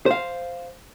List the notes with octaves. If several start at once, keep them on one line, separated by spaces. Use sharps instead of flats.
C5 F5